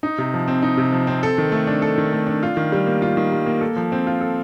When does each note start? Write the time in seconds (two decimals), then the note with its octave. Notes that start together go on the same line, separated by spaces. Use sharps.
0.03 D#4
0.18 C3
0.34 F3
0.48 C4
0.62 D#4
0.77 C3
0.92 F3
1.07 C4
1.23 A4
1.38 D#3
1.52 A3
1.67 D4
1.82 A4
1.98 D#3
2.13 A3
2.27 D4
2.43 F4
2.57 D#3
2.72 G3
2.87 A#3
3.02 F4
3.17 D#3
3.32 G3
3.46 A#3
3.61 A4
3.76 F3
3.92 C4
4.07 F4
4.21 A4